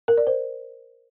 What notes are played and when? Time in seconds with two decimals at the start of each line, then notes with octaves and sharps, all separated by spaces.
0.08 A#4
0.17 D5
0.27 C5